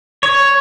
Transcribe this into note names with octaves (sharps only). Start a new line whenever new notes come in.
C#5